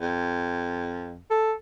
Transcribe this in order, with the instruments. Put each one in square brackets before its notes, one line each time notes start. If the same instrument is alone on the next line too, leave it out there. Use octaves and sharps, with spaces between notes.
[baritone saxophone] F2
[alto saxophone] A4